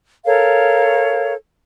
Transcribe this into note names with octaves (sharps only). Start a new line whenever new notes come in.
A4 A#4 C#5 F5